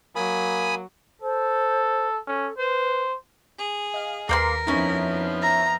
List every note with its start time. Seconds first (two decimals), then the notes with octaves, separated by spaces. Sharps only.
0.16 F#3 A#3 G#5 B5 D#6
1.22 A4 C5
2.27 C#4 A4
2.58 B4 C5
3.58 G#4
3.94 D#5 F5
4.29 D#2 A#3 A#4 B4 G5 C6 B6
4.67 F2 F3 B3 C#4 D#4 E4
5.42 E5 A#5